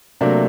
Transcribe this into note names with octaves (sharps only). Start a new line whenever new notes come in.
C3 F#3 A3 A#3 D4